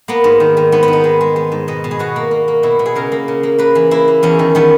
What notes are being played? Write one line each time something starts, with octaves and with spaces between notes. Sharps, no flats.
A#3 B3
G#2
D#3
D#3
G#2 B3
B3
D#3
D#4
G#3
G#3
G#3
G#2
B2 D#5
B2
G#4
B2 F#4
A#3
A#3
A#3
B2 E4
B2
G#4
C#3 A#4
A#3
C#3
A#3
A#3 B4
E3
A#3 E4
A#3
E2 C#4
D#3
D#3 B3